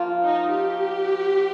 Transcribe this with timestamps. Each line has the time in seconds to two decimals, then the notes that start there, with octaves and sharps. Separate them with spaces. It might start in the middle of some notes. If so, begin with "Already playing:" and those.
Already playing: F3 A#3 F4
0.24 D#4
0.54 G4